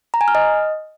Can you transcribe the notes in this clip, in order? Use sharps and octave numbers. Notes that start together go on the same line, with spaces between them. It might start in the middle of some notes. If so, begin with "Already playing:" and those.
A#5
G#5
F6
D#5